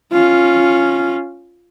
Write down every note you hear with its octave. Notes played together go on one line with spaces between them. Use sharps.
C#4 F4